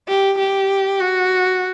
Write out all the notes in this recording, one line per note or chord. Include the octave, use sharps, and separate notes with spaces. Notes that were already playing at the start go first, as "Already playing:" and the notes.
G4
G4
F#4